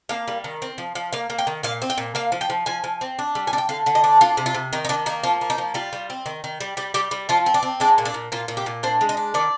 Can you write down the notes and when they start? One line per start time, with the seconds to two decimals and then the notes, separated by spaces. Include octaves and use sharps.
0.09 A#3 F5
0.28 G3
0.44 D#3
0.62 C4
0.78 F3
0.95 F3
1.13 A#3 F5
1.30 A#3
1.38 G5
1.47 D#3
1.63 A#2 F5
1.82 C4
1.90 G5
1.98 A#2
2.15 A#3 F5
2.32 F3
2.41 G5
2.50 F3
2.66 F3 G#5
2.84 F3
3.01 C4
3.19 D4
3.35 G3
3.47 G#5
3.53 D4
3.58 G5
3.69 D3 F5
3.86 D3
3.95 D#5
4.04 D4
4.21 D4 F4
4.37 C3
4.46 F4
4.54 C3
4.73 D#3 D#4
4.85 D#4
4.89 D#3 D4
5.06 A#3 D#4
5.23 F3 F4
5.41 A#3
5.50 D#4
5.58 F3
5.74 G3 F4
5.93 G3
6.10 C4
6.26 D#3
6.44 D#3
6.61 G3
6.77 G3 G4
6.94 G3 G4
7.11 G3
7.29 F3 F4
7.46 C4
7.54 D4
7.63 C4
7.80 G#3 D4
7.98 A#2
8.05 D4
8.14 A#2
8.32 A#2 F4
8.48 A#2
8.57 G4
8.66 A#2
8.83 D4 C5
9.01 G#3
9.09 D#5
9.17 D4
9.34 D#3 D5